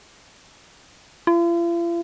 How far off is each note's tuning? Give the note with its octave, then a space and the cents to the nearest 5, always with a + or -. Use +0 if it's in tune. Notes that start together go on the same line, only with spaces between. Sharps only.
F4 -45